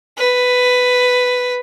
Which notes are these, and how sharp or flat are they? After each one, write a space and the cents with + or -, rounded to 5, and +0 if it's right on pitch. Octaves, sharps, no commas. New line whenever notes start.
B4 +10